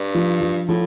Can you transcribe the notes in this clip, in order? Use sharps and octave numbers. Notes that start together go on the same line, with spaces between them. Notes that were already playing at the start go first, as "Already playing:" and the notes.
Already playing: G2
F3
F3
A2 F3